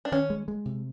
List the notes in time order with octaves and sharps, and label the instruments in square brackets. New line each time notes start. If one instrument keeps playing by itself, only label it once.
[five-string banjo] D4
[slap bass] D#3 [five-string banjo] C#4
[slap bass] G#3
G#3
C3